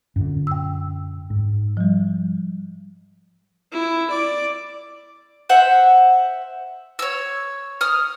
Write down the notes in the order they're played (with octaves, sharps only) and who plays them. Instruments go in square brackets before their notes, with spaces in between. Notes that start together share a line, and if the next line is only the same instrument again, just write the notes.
[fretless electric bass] F#2 A#2 D3
[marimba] G5 E6
[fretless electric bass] G#2
[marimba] F3 G3
[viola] E4
D5
[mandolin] C5 E5 F#5
C#5 E6
D#6 F6